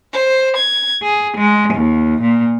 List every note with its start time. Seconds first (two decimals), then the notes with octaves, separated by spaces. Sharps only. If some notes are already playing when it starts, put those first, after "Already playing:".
0.13 C5
0.56 G#6
1.03 G#4
1.38 G#3
1.73 D#2
2.22 A#2